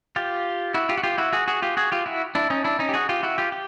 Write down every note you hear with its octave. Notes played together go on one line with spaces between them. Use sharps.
F4 G4
E4 F#4
F4 G4
F#4
F4 G4
E4 F#4
F#4 G#4
F#4 G#4
F4 G4
F#4 G#4
F4 G4
E4 F#4
D4 E4
C#4 D#4
D4 E4
C#4 D#4
G4
F#4 G#4
F4 G4
E4 F#4
F4 G4
G4